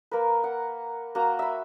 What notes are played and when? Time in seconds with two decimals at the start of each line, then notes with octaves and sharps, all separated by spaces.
0.11 A#3 A#4 B4
0.44 F#5
1.15 A#3 F#4 A#5
1.39 E5 B5